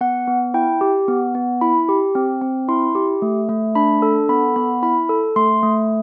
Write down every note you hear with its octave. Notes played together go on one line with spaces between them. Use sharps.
B3 F#5
B3
E4 G5
G4
B3
B3
E4 B5
G4
C4
C4
E4 C6
G4
A3
A3
D4 B5
A4
B3 B5
B3 B5
E4 B5
A4
A3 C6
A3